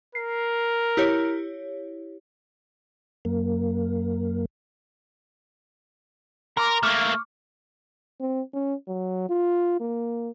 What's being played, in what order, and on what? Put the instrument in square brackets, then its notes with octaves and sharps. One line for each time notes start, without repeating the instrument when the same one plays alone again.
[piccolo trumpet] A#4 [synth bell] C7
[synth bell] E4 G4 C#5
[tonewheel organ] F#2 A#3
[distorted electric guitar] A#4 [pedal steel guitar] A#5 C6 D6
[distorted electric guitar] A3 A#3 [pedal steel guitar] C#6 D6 F6
[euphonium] C4
C#4
F#3
F4
A#3